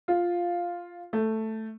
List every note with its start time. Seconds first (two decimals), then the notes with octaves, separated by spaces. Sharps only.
0.08 F4
1.13 A3